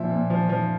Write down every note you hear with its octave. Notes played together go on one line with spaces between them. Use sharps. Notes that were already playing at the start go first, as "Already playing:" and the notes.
Already playing: A#2 F3 E5
A#2
F3
F3